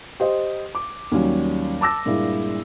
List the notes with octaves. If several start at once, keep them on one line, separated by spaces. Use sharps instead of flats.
G4 C5 D#5
D6
D#2 F#3 G3 C#4
A5 D6 E6 A#6
G2 A#2 G#3 A#3 E4